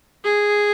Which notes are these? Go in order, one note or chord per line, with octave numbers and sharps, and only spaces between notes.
G#4